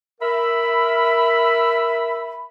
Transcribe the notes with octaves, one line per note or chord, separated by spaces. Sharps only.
A#4 E5 B5